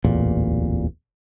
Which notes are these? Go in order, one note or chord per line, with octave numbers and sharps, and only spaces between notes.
D1 A1 E2 A#2